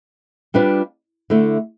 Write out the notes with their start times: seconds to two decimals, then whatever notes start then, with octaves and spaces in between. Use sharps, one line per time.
0.54 G3 D4 F4 B4 D5
1.30 D3 A3 E4